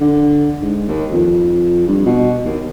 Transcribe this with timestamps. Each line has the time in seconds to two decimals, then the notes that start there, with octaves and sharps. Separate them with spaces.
0.01 D3
0.62 G#2
0.89 D#2
1.13 F2
1.87 G2
2.06 B2
2.45 D#2